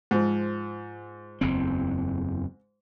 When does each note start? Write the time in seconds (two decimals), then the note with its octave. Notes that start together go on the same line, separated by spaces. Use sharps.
0.11 G#2 F3
1.41 F#1 E2 C4